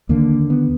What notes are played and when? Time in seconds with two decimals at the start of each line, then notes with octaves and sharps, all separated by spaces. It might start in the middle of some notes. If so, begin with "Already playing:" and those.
0.09 D#2 D3 A#3
0.50 B3